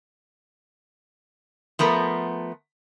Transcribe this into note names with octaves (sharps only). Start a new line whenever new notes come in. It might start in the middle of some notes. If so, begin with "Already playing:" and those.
F3 A3 B3 A#4